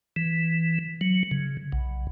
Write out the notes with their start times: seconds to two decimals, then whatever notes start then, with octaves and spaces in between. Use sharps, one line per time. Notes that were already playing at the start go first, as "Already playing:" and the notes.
0.16 E3
1.01 F#3
1.31 C#3
1.72 B1